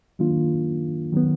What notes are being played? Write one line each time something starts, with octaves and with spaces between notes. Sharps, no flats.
D#3 F#3 A#3 D4 F4
D#3 F#3 B3